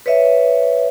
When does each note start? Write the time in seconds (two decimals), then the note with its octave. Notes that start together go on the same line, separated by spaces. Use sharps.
0.06 B4 C#5 D#5 E5